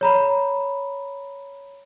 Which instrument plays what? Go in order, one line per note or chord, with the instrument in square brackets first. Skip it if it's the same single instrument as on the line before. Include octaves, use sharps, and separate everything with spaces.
[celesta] C#5 A#5 B5